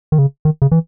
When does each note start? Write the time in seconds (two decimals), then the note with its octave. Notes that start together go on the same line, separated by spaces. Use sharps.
0.12 D#3
0.18 C#3
0.45 D#3
0.62 C#3
0.72 E3